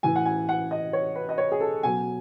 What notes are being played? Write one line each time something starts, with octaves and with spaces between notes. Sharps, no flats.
A2 E3 G#5
F#5
G#5
F#5
D#5
C#5
B4
D#5
C#5
G#4
A4
B2 F#3 G#5